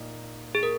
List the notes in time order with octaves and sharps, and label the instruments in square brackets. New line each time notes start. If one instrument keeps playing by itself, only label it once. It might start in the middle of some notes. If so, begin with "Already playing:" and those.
Already playing: [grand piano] A#2 A#3 D#4
[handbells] G#4
A#4